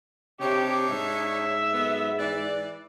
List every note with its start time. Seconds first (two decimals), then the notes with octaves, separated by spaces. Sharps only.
0.41 C3 D4 D#4 G4 C#5
0.91 G#2 E5
1.73 F#3 A3 B3
2.19 E3 B4 D5